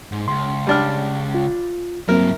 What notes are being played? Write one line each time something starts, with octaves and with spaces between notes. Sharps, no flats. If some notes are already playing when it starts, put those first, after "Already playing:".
G#2
C#2 C6
G3 D4 F6
F4
G2 F#3 A#3 C4 E4 A#4